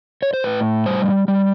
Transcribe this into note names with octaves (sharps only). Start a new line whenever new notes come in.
C#5
C5
A2 B4
G3 C5
G3